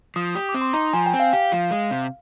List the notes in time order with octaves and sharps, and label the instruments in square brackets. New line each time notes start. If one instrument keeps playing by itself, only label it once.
[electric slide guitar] F3 [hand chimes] D#6
[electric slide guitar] G4 [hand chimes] D#6
[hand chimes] D6
[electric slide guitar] C4
[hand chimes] C6
[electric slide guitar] D#4 [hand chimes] A#5
[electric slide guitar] F3 [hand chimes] G#5
[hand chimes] G5
[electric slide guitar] C4
[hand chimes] F5
[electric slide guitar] G4
F3
G#3
C3